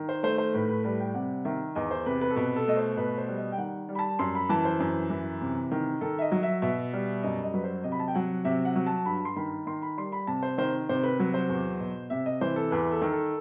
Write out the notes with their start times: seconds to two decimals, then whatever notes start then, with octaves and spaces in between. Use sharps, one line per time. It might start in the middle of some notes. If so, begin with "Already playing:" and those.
Already playing: D#3
0.09 C5
0.23 A3 C5
0.38 C5
0.54 A2 B4
0.68 B4
0.84 G3 B4
1.00 G5
1.14 C3 F#5
1.45 D#3 E5
1.75 E2 D#5
1.91 C5
2.06 C3 B4
2.21 B4
2.30 A4
2.36 B2 B4
2.56 A4
2.67 A3 D#5
2.77 C5
2.97 B2 B4
3.18 C5
3.28 G3
3.37 D#5
3.52 G5
3.58 D#3 F#5
3.89 G3
3.95 B5
3.99 A5
4.19 F#2 C6
4.35 B5
4.49 E3 A5
4.65 C5
4.80 F#2 C5
5.10 E3 B4
5.41 C3
5.71 D#3
6.01 D#3 A4
6.19 E5
6.22 D#5
6.32 F#3
6.43 E5
6.62 B2 E5
6.93 G3
7.23 F#2 D#5
7.43 D#5
7.54 F#3 B4
7.64 C5
7.84 C3 D#5
7.92 B5
8.00 A5
8.08 G5
8.15 F#3 F#5
8.45 C3 E5
8.65 F#5
8.76 F#3
8.86 A5
9.06 G2 B5
9.25 C6
9.36 D#3 B5
9.67 D#3 C6
9.82 B5
9.98 G3 C6
10.12 B5
10.27 C3 A5
10.43 C5
10.58 D#3 C5
10.89 C3 C5
11.04 B4
11.19 F#3 B4
11.34 C5
11.49 E2
11.80 B2
12.10 C3 E5
12.26 D#5
12.41 E3 C5
12.56 A4
12.71 E2 B4
12.91 A4
13.02 D#3
13.12 A4